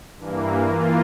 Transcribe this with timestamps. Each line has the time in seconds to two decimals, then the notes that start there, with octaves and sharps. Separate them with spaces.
0.18 G2 E3 A#3
0.65 E3 A#3 F4